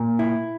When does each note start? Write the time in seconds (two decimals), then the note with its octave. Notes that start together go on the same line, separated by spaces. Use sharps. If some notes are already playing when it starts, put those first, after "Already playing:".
Already playing: A#2
0.19 E4